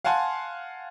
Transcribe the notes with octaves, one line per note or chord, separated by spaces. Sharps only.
F5 F#5 G#5 A5 C6